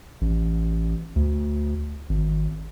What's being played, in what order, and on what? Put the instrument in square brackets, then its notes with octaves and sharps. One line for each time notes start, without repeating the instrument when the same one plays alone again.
[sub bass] A1
D2
G#1